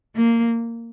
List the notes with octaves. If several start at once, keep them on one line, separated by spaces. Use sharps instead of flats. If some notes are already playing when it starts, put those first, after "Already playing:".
A#3